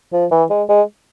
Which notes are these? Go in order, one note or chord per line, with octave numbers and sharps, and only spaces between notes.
F3
E3
G#3
G#3